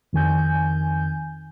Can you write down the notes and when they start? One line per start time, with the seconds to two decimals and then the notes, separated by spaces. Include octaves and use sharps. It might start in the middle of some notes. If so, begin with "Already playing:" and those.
0.13 F2 D#3 G#5 G6